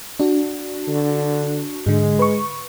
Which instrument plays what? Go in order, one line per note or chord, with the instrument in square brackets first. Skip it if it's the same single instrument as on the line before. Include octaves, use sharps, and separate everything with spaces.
[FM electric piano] D4 F#4
[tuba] D3
[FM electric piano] G#2 D3 [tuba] G#3
[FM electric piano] B4 C#6